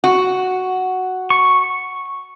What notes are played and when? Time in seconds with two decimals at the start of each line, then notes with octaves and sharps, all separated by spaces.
0.04 F#4
1.30 C#6